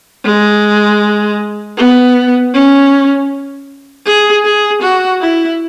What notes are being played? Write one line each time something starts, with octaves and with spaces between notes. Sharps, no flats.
G#3
B3
C#4
G#4
G#4
F#4
E4